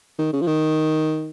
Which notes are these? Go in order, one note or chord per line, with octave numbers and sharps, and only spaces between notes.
D#3
C#3
F3
D#3